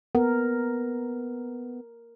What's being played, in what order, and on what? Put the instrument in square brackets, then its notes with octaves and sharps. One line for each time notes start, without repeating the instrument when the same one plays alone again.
[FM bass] B3 [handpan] A#4